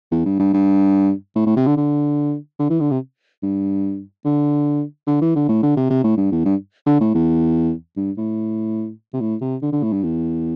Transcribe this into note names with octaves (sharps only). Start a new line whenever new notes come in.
E2
G2
G2
G2
A2
A2
C3
D3
D3
D3
E3
D3
C3
G2
D3
D3
E3
D3
A2
D3
C3
C3
A2
G2
E2
G2
D3
A2
E2
G2
A2
C3
A2
C3
D3
D3
A2
G2
E2